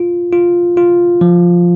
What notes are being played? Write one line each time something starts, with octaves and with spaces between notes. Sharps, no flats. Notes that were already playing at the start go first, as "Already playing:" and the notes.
Already playing: F4
F4
F4
F3